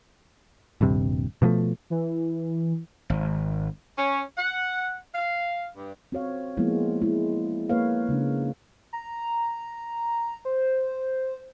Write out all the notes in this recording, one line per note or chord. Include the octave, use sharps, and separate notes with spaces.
D#1 G2 C3
B2 F3 G3 A3
E3
G#1
C#4
F#5
F5
G2
C4 F#4 C#5 F5
F3 G#3 A#3 B3 E4
G#3 E4
A#3 B4 C#5 F5
C#3 G#3 D4
A#5
C5